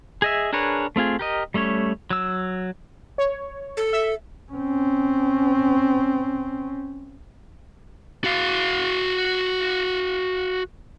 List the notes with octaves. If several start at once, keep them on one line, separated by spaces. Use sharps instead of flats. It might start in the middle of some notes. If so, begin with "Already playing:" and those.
G#4 D#5 E5
D4 G#4 A#4 B4 C#5
A3 C4 F4 G#4
G4 A#4 D#5
G3 A3 C#4 C#5
F#3 E6
C#5
A4
E5
C4 C#4
F#4 F5